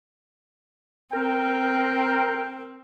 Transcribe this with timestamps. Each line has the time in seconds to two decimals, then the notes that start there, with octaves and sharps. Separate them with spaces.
1.13 C4 A#4 G5